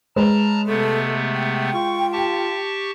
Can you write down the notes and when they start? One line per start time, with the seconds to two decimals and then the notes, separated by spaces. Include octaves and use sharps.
0.16 G#3 B4 C#5 A5 A#5 F6
0.66 C3 A3 B3 A4
1.34 G5
1.74 F4 C#6
2.12 G4 A5 C#6